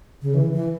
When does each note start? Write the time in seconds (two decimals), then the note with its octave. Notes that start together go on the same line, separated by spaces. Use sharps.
0.22 C#3
0.34 E3
0.53 E3